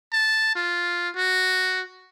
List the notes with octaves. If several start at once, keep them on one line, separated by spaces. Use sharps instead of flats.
A5
F4
F#4